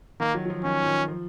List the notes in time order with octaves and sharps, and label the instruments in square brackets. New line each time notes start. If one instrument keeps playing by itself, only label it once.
[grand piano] D#3 [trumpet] A#3
[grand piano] F#3
F#3
F3
[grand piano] D#3 [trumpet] C#4
[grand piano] F3
D#3
F3